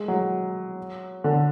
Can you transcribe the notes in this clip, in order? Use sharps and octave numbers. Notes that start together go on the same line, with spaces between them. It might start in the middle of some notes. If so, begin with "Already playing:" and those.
Already playing: G#3
F#3
D3